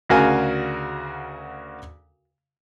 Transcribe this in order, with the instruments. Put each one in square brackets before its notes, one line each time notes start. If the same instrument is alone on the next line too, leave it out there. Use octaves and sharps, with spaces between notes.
[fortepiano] D2 C#3 F#4 A#4 F5 G#5